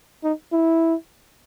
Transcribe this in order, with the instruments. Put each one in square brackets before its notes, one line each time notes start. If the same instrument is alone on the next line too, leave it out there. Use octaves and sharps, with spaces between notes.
[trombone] D#4
E4